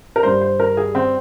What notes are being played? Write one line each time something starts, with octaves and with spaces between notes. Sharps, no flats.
A#4
G2 G3 C5
C5
A#4
G#4
C4